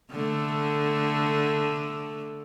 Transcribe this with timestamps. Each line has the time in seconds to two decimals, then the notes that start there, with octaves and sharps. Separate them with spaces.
0.11 D3 A3